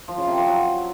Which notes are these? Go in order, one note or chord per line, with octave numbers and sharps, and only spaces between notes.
F3
C#3
C3
F3
F#3